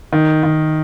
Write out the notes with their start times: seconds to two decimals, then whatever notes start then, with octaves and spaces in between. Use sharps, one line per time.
0.13 D#3
0.43 D#3